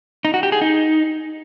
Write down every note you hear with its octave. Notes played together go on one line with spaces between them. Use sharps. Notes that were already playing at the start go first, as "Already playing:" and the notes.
D#4
F#4
G4
G#4
D#4